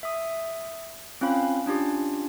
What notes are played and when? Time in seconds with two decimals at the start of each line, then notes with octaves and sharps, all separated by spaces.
0.03 E5 D#6
1.21 C4 C#4 F4 F5 B5
1.66 C#4 D4 F4 G4